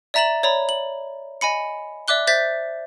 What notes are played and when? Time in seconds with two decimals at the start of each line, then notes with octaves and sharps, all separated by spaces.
0.14 D5 E5 A#5 A6 E7 F#7
0.43 C#5 D5 A#5 B5
0.69 F#7
1.41 D#5 G#5 B5 C#7
2.08 D5 E5 D6 F#6 G7
2.27 C5 E5 G6 A6 B6